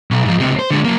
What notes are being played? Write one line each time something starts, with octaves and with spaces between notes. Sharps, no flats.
B1
G#2 F3
C#2 C3
C5
D3 G#3
F#3 A#3